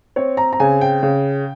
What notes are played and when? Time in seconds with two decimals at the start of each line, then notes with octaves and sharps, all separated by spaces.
0.16 C4 C#5
0.37 A#5
0.53 A#5
0.60 C#3 G#5
0.81 G5
1.03 C#3